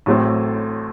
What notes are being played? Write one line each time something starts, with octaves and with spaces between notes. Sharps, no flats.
A1 A2 F#3 A3 C4